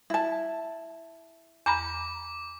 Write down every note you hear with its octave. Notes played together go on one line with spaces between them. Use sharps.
E4 A5
E2 A#5 B5 D6